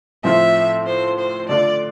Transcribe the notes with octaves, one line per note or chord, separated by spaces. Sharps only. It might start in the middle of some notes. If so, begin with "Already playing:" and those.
A2 F3 C4 F4 E5
C5
C5
D3 A3 D4 F4 D5